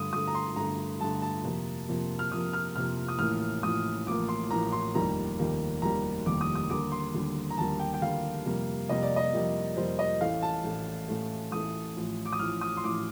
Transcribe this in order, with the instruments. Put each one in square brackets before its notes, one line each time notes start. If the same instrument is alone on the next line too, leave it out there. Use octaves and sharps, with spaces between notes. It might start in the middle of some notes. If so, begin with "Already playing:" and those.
Already playing: [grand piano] G2 D3 A3 D#6
G2 D3 A3 D#6
A#5
C6
G2 D3 A3 A#5
G2 D3 A3 A5
A5
F2 C3 F3 A#3
F2 C3 F3 A#3
F6
F2 C3 F3 A#3 D#6
F6
F2 C3 F3 A#3 F6
D#6
A1 A2 F3 A#3 F6
A1 A2 F3 A#3 D#6
A1 A2 F3 A#3 D6
C6
A1 A2 F3 A#3 A#5
C6
F1 D#2 D#3 G3 A#3 A#5
F1 D#2 D#3 G3 A#3
F1 D#2 D#3 G3 A#3 A#5
F1 D#2 D#3 G3 A#3 D6
D#6
D#6
D#2 D3 G3 A#3 D6
C6
D#2 D3 G3 A#3
A#5
D#2 D3 G3 A#3 A5
G5
G5
D#2 D3 G3 A#3 F5
F2 C3 G3 A#3
F2 C3 G3 A#3 D#5
D5
D#5
F2 C3 G3 A#3
F2 C3 G3 A#3 C5
D#5
A1 A2 A3 F5
A5
A1 A2 A3
A1 A2 A3
A1 A2 A3 D#6
A1 A2 F3
D6
D#6
A1 A2 F3 F6
D#6
C6
A1 A2 F3 D6